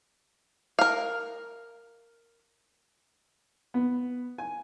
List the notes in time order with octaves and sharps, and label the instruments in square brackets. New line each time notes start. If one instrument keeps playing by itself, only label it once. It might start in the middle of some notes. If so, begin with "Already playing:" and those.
[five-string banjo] A#4 F5
[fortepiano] B3
G#5